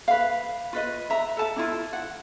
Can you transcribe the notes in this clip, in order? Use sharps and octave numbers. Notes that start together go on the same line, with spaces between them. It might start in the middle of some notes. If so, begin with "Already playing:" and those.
B4 F5
F4 B4 D#5
E5 A#5
A4 A5
D4 E4 F4
F#5